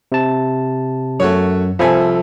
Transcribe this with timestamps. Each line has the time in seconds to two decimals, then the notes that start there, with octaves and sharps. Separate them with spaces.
0.12 C3 A5
1.20 F#2 A3 F#4 C#5
1.79 C2 F3 C4 A4 E5 G#5